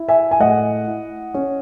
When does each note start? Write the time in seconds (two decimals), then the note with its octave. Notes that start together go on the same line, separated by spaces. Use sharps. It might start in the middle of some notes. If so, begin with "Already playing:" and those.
Already playing: E4
0.09 E5 G#5
0.31 G#5
0.40 A2 D#5 F#5
0.87 E4
1.34 C#4